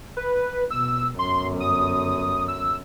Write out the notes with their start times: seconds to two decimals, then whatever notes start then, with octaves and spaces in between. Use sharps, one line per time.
0.17 B4
0.71 B2 E6
1.19 G1 F#2 C6
1.60 D#6
2.48 E6